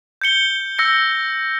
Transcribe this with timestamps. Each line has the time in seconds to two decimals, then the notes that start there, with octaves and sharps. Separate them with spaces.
0.21 G6 C#7 G7
0.79 E6 G6 A#6 C#7